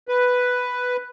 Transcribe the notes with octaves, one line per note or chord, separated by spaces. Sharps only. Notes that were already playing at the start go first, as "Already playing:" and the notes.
B4